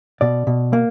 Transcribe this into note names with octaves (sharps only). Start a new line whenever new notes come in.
B2 D5
B2
A#3